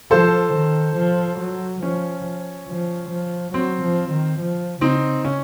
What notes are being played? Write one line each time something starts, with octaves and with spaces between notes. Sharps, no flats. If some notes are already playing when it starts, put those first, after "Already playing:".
F3 A4 C5
D#3
F3
F#3
F3 C#4
F3
F3
F#3 C4
F3
D#3
F3
C#3 C4 D#4
C#4